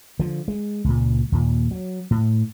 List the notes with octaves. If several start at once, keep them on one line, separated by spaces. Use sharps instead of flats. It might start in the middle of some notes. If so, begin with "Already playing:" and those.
D3 F3
G#3
C#2 A#2
D#2 A#2
F#3
A2